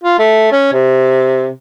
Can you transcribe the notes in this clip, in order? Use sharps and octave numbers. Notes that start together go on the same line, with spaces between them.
F4
A3
C#4
C3